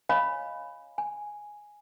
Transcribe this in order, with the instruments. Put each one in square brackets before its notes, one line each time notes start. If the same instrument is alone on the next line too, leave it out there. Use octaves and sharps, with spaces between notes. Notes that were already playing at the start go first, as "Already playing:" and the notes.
[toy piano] C#5 D#5 F5 G#5 B5
G#5